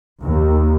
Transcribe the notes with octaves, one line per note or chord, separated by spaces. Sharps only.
D#2